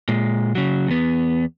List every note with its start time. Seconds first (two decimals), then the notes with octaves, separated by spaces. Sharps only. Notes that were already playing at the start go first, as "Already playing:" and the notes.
0.08 A#2 G#3
0.55 C#3 F#3
0.88 E2 B3